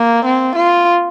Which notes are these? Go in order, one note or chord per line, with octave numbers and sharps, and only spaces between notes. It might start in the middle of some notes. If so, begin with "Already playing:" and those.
Already playing: A#3
C4
F4